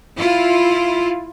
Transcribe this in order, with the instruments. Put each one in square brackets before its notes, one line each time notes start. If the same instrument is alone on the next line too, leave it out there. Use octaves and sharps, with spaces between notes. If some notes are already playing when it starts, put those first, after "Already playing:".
[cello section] E4 F4